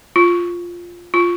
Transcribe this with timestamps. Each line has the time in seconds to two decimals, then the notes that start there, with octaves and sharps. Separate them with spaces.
0.16 F4
1.14 F4